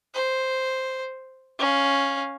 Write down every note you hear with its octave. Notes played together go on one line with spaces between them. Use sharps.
C5
C#4 F5